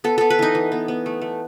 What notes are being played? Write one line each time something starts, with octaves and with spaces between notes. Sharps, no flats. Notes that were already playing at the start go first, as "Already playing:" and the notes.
B3 A4
B3 A4
B4
E3 D#4
E3
B3
B3
A3
A3